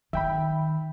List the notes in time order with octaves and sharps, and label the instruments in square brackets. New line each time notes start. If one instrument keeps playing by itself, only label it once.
[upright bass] D#3 [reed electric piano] E5 G5 B5